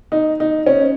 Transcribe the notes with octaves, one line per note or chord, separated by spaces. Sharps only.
D#4
D#4
C#4